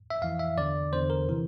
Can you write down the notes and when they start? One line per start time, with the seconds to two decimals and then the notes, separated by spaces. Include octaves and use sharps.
0.10 E5
0.22 F2 E3 F5
0.39 E5
0.57 E2 D3 D5
0.92 E2 D3 C5
1.10 A#4
1.29 C3 E3